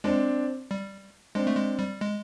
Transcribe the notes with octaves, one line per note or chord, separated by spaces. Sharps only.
G#3 C4 D4
G3
G#3 C4 D4
A3
G#3
G3
G#3